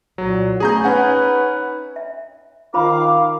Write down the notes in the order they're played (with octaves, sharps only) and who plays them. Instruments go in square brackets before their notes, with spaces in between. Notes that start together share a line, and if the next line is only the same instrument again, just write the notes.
[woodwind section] C2 A#2 [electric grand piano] F#3
[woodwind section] A3 B3 C#4 [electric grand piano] G#4 A#5 G6
[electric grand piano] C#4 F#5 G#5 [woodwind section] D#4 B4
[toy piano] E5
[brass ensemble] D#3 A#4 F5 [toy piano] F4 C5 B5 [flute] D6